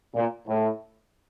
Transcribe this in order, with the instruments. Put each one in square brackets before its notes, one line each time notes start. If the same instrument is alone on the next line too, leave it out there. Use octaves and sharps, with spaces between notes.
[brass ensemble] A#2
A2